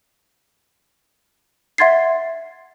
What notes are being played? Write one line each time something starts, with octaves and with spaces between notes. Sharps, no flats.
E5 F#5 C6 G#6 A6 C7